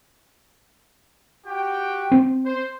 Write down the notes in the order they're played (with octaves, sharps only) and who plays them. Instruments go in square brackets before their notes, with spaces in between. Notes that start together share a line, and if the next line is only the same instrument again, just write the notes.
[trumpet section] F#4 G4 G5
[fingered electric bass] C4
[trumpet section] C5